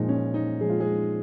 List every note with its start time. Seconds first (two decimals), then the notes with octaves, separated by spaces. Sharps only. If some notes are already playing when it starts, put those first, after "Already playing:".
Already playing: A#2 F3 G#3 D#4
0.09 C#4
0.34 D#4
0.60 A#2 F3 G#3 G#4
0.70 F4
0.80 G#3 G#4